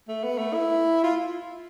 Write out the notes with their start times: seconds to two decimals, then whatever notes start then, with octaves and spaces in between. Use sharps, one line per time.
0.08 A3
0.24 B3
0.38 A3
0.54 E4
1.04 F4